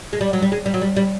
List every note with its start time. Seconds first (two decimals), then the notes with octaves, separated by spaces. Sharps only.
0.13 G#3
0.21 G3
0.33 F#3
0.42 G3
0.52 G#3
0.66 G3
0.74 F#3
0.82 G3
0.96 G3